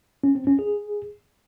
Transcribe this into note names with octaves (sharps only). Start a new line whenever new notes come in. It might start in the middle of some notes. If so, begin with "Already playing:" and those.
C#4
C4
C#4
G#4